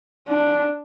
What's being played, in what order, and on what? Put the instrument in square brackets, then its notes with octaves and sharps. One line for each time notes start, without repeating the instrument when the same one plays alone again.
[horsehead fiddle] D4